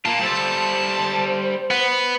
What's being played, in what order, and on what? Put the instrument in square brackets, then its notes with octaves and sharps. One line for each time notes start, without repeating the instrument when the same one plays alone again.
[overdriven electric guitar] A#3 F4 [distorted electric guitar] A5
[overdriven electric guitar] G3 A4 [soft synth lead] C5
[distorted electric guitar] B3